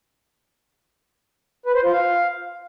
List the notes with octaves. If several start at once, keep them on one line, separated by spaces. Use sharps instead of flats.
B4
C5
F4
F5